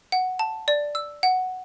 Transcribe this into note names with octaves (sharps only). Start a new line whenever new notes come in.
F#5
A5
D5
E6
F#5